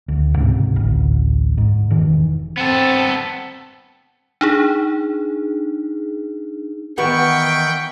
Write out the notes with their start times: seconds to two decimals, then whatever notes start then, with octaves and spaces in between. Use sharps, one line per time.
0.08 D2
0.35 C#2 G#2 C3
0.76 A1 D2
1.58 G#2
1.90 E1 D#3 E3
2.58 B3 C4 A4
4.41 D4 D#4 G#4
6.98 D#3 E3 B3 F#4 G5 B5 C#6